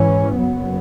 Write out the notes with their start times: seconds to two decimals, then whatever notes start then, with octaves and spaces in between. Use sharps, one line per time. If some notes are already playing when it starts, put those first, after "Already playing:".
Already playing: G#2 E3 C#4
0.36 F#1 F#2 F#3 B3